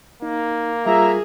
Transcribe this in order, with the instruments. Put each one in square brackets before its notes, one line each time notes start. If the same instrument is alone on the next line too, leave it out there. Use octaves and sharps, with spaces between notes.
[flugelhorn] A#3 [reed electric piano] D#4
[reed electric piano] G3 F4 A#4 [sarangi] G#4 [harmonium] E5 A#5